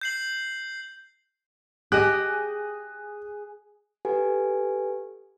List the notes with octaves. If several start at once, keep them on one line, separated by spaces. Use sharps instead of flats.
G6 C7 F#7
G4 G#4 D#5 F#6
G4 A4 B4 F#5 G#5